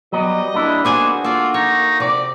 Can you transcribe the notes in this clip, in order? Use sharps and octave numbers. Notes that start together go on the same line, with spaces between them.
F#3 G3 B3 D#5
A#3 D4 E4
A#3 B3 D4 F#4 G#4 C5 G#5
A#3 F4 A4 D5
D#4 C#5
C3 D5